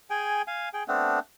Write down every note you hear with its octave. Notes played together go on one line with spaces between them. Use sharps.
G#4 G5 G#5
F5 G#5
G#4 G5
A3 B3 C4 D4